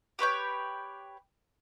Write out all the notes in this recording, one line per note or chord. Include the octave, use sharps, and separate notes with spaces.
G4 B4 C#5 G5